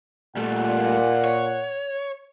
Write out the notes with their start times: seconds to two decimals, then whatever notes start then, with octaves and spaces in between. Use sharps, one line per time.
0.37 A#2 G3 A3 F#5
1.25 C#5